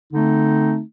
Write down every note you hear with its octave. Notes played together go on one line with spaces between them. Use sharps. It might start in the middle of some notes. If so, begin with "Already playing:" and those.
D3 A3 C4 D#4